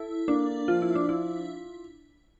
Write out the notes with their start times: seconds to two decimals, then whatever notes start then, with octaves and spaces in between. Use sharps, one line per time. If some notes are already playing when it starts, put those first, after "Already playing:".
Already playing: E4 A4
0.28 A#3 D4
0.68 F3 F4
0.82 E4
0.95 D4
1.09 E4 F4